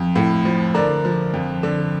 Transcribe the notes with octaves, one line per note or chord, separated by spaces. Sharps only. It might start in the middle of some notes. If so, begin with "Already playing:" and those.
Already playing: F2
A2
F3
D3 A#4 D5
F3
F2
D3